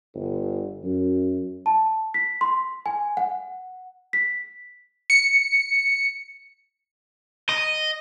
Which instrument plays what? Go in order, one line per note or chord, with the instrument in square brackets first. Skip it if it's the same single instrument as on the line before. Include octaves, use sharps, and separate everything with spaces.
[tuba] G1
F#2
[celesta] A5
B6
C6
G#5
F#5
B6
[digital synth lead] C#7
[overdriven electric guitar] D#5